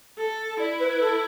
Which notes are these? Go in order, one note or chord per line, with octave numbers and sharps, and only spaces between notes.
A4
E4 D5
B4
B4
A4